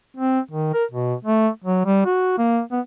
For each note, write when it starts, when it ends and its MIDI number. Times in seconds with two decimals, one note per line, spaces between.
0.17 0.40 60
0.51 0.73 51
0.73 0.84 70
0.91 1.14 47
1.25 1.48 57
1.64 1.83 54
1.86 2.02 55
2.05 2.38 66
2.38 2.61 58
2.72 2.80 59